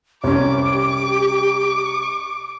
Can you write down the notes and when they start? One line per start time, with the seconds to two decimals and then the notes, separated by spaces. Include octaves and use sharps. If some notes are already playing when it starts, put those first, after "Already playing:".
0.24 C2 C#4 G4 D6